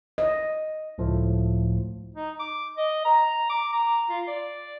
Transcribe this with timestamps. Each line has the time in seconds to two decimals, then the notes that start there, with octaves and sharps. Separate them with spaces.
0.18 D#5
0.98 C#2 A2 F3 A3
2.14 D#4
2.39 D6
2.77 D#5
3.05 A#5
3.50 D6
3.73 A#5
4.09 F4
4.27 D5